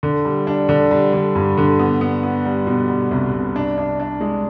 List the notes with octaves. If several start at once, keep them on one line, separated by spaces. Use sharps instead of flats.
D3
G3
D4
D3
G3
D3
G2
D3
B3
B3
B3
G3
B2
G3
C2
C2
D4
D4
D4
G#3